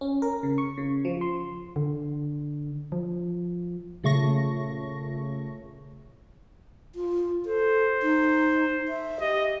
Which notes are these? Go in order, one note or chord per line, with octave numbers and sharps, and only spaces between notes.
C#4
A#4
C#3
C#6
C#3
F3
C6
D3
F3
A#2 C#3 A3 C#6 A#6
F4
A4 C5
D#4
E5
G4 D#5